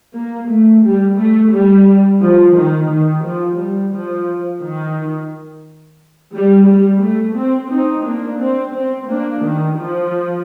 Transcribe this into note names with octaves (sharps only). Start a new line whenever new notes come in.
A#3
A3
G3
A3
G3
F3
D#3
D#3
F3
G3
F3
D#3
G3
G3
A3
C4
C4 D#4
A#3 D4
C4
C4
A#3 D4
D#3
F3